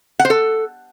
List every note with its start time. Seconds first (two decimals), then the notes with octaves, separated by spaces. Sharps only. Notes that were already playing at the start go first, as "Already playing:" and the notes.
0.19 F#5
0.25 C5
0.30 A4